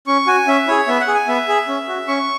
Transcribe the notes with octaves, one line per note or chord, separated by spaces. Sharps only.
C#4 C#6
F#4 G#5
C#4 E5
E4 G#4 C#5
B3 E5
F#5
G#4
G#5
B3 E5
G#4
C#4
F#4
C#4 C#6